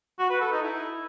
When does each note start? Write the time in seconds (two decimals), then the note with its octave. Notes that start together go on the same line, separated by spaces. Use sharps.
0.19 F#4
0.30 B4
0.41 A4
0.52 D#4
0.63 E4